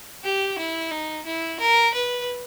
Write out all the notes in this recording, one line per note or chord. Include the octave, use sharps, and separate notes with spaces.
G4
E4
D#4
E4
A#4
B4